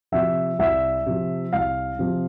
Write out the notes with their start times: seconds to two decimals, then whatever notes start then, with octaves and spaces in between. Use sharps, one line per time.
0.12 C3 F3 E5
0.59 C2 E5
1.06 C3 F3
1.53 C2 F5
1.99 C3 F3